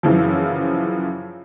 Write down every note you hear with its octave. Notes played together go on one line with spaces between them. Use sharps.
F#2 C#3 E3 F3